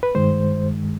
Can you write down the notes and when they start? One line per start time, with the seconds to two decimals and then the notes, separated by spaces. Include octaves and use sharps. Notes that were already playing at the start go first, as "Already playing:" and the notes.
0.03 B4
0.15 G2 D#3 G#3 C5